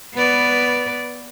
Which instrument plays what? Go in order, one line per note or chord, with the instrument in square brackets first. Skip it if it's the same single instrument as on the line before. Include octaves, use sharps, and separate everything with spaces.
[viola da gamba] B3 B4 D5